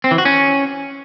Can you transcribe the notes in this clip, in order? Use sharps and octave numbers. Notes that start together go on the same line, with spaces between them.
C4
E3
F#4
C#4